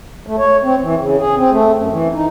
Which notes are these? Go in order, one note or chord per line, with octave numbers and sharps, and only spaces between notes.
A3
C#5
C4
E3
C#3
G#4
C4
A3
F#2
E3
D#4